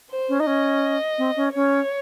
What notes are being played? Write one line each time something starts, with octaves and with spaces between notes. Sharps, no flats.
C5
C#4
D#4
C#4 D#5
C4
C#4
C#4 C#5